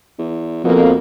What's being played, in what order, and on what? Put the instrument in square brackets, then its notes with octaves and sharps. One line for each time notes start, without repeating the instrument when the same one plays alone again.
[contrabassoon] E2
[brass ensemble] F2 A#3 [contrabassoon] B2